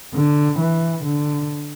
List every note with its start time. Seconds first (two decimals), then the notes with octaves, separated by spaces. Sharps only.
0.15 D3
0.59 E3
1.05 D3